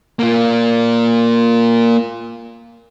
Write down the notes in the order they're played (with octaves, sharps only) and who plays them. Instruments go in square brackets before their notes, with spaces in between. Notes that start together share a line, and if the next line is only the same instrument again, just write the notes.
[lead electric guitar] A#3 F4